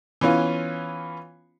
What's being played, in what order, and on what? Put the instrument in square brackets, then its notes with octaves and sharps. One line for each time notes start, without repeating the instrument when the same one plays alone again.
[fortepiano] E3 B3 C#4 F4